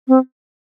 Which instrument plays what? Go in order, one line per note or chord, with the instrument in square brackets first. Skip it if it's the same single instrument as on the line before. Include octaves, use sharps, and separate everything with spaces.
[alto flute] C4